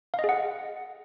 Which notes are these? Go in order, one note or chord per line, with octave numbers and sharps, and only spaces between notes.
F5
D#5
G#4
F#5